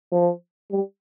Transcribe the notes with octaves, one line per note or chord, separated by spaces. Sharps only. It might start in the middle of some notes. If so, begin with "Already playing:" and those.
F3
G3